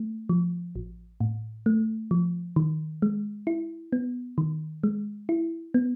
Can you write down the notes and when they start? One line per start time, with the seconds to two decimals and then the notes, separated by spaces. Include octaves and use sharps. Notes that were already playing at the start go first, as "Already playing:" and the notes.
Already playing: A3
0.29 F3
0.76 A1
1.20 A2
1.66 A3
2.11 F3
2.56 D#3
3.02 G#3
3.47 E4
3.93 B3
4.38 D#3
4.84 G#3
5.29 E4
5.74 B3